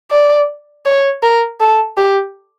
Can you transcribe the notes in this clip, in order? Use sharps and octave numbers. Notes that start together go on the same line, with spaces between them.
D5
C#5
A#4
A4
G4